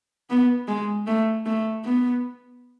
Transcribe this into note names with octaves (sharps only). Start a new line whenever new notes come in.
B3
G#3
A3
A3
B3